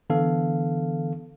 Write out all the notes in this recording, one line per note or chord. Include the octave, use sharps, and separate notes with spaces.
D3 E3 B3 A4 F5